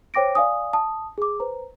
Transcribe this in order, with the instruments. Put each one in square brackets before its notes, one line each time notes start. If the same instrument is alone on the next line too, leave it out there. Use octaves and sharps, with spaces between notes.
[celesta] C5 C#5 G5 D6 A#6 D7
D5 F5 G#5 D#6
A5 D#6
G#4 D6
B4 C5 A#5